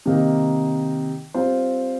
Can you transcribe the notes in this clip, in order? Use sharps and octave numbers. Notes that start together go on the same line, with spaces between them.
C3 D#3 A#3 D#4
G3 C4 F4 C5